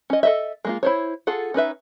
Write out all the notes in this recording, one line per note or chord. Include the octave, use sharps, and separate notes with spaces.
C#4 D#5
A4 D#5 E5
G#3 A#3 F4
E4 C5 C#5
F4 G#4 A4 F#5
C#4 D#4 B4 E5